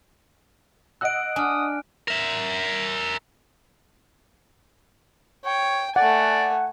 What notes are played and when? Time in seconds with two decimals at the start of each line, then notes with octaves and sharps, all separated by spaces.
1.01 D#5 F#5 E6 F#6 D7
1.36 D4 G#5 D#6 F6
2.08 A#4 E5
5.45 C#5 G5
5.96 A3 D5 F#5 G#5